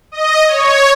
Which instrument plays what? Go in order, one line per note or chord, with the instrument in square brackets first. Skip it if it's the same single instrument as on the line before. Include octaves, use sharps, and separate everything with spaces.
[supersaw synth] D#5
C#5